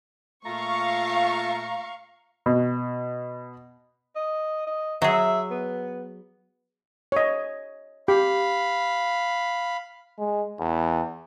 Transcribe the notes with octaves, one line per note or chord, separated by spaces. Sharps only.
A#2 A3 F4 F5 A#5 C#6
B2
D#5
D#5
F#3 G#4 E5
B3
C#5 D#5
G4 F5 B5
G#3
E2